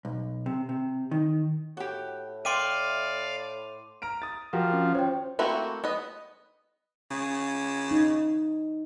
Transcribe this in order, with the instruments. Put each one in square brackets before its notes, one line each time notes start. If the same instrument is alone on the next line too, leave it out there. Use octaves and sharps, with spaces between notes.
[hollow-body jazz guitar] B1
C3
C3
D#3
[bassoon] A2 [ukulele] F#4 G4
[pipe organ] D5 F5 [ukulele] E5 G5 [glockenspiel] C6 D6 D#7
[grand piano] A#5 F6 D7
D#6 A6
[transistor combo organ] F3 [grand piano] F#4 G4 A#4
[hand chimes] C#4
[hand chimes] C5 G5 [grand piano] C#5
[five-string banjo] A3 A#3 C4 E4 F#4
B3 D#5
[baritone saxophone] C#3
[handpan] D#4